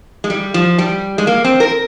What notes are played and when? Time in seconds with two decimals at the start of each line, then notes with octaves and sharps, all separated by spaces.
0.24 G#3
0.30 G3
0.54 F3
0.78 G3
1.18 G#3
1.27 A#3
1.44 C4
1.60 A#4